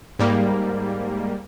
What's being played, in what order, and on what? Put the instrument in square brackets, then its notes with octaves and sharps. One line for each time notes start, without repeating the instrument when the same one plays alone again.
[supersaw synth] G#2 G3 A#3